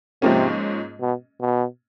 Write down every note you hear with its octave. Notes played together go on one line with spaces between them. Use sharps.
G#2 C3 F3 A#3 C#4
B2
B2